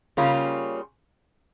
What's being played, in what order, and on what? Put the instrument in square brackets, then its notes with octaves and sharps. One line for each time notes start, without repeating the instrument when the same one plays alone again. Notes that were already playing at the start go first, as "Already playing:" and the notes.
[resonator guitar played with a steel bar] C#3 G3 A#3 C#4 F4